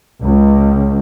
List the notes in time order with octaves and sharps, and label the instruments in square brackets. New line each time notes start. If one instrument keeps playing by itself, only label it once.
[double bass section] C#2